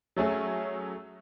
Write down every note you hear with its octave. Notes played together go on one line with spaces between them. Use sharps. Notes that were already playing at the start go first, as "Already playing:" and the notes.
F#3 A3 C#4 G#4